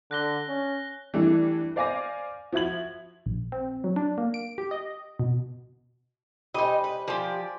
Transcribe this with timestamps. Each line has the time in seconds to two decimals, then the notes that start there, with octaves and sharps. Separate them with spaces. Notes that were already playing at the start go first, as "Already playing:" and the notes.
0.11 D3 F#6 A#6 G7
0.48 C#4
1.14 E3 G3 A3 D4 E4
1.76 C5 D5 F5 G#5 D6 A#6
2.52 F3 F#4 E5 G#6 F#7
3.26 A#1
3.52 C4
3.84 F#3
3.96 D4
4.18 A#3
4.34 D7
4.58 G4
4.71 D#5
5.19 B2
6.54 G3 D#4 C5 D#5 G#5
6.84 B4
7.08 F3 G4 D5 G#5